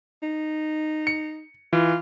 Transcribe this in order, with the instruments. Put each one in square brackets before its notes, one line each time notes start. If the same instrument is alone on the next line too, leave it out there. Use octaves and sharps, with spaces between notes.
[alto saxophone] D#4
[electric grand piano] C#7
[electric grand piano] E3 [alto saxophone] F4